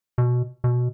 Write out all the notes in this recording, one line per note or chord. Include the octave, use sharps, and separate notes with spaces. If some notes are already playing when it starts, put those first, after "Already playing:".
B2
B2